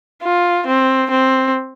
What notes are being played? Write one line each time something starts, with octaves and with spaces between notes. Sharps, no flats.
F4
C4
C4